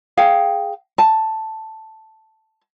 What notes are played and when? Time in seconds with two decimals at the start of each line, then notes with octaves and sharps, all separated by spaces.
0.17 G#4 F5 G5
0.98 A5